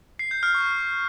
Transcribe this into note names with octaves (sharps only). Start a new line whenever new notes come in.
C7
G6
F6
C#6